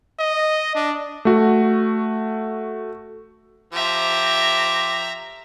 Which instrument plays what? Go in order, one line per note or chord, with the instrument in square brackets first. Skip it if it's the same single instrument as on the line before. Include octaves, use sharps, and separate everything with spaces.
[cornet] D#5
D4
[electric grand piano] A3 F#4
[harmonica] F3 G4 [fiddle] E5 A#5